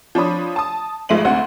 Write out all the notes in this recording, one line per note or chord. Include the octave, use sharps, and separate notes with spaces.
F3 D4 C#5 B5 D#6
A5 D#6
G#1 G#3 F4 E5 D#7 F#7
D2 C4 F#5